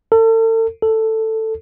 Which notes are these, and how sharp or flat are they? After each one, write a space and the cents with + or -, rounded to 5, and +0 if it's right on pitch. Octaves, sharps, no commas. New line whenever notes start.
A4 +40
A4 +10